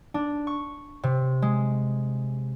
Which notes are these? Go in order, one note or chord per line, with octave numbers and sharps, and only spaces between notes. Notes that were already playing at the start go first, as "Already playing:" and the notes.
D4
C#6
C3
G#3